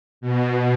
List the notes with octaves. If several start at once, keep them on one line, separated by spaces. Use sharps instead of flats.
B2